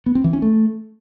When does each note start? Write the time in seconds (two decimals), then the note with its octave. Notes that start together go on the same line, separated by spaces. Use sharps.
0.06 B3
0.15 C4
0.24 E3
0.33 C#4
0.42 A3